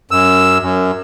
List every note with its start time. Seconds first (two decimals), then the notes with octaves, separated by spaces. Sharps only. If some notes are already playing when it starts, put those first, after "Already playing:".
0.11 F#2 E6
0.62 F#2